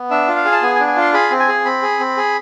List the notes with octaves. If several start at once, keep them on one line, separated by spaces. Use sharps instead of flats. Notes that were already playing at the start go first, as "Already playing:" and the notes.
Already playing: B3
D4 E5
F4
F5
G#4
A5
B3 G#5
G#5
D4
G#5
F4 C6
G#4 B5
C4
G#5
G#4
C4 B5
G#4
C4
G#4